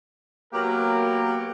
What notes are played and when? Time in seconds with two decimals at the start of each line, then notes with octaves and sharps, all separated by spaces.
0.53 F#3 A#3 B3 G4 A#4